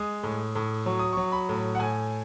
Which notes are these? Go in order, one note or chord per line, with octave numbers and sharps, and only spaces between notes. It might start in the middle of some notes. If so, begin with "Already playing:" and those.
Already playing: G#3 D#6
A2
A2
F#3 C#6
D#6
F#3 C#6
B5
A2
F#5
A2 G#5